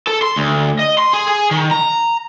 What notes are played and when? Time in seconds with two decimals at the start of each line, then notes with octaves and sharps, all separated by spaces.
0.07 A4
0.22 C6
0.36 D2
0.79 D#5
0.99 C6
1.14 G#4
1.28 G#4
1.51 D#3
1.71 A#5